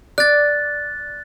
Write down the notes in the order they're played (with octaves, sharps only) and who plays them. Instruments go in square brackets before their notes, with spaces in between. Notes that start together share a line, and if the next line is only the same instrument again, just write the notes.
[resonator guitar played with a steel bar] D5 [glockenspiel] F#6 A6